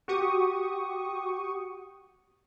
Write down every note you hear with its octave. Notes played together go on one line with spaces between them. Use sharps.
F#4 G4 C#6 D#6